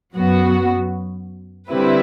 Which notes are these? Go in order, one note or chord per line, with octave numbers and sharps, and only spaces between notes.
F#2 F#3 B3 F#4
D3 G3 C4 E4 B4